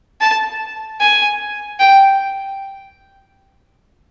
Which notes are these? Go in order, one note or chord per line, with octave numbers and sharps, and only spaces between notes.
A5
G#5
G5